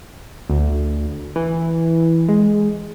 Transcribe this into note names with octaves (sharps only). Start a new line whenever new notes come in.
D2
E3
G#3